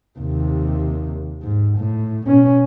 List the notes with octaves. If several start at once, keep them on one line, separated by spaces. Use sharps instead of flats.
D#2 C3
G#2
A2
B2 C#4